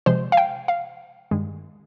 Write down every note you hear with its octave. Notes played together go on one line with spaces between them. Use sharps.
C3 F3 G#3 C5
F5
G5
F5
G2 D#3 G#3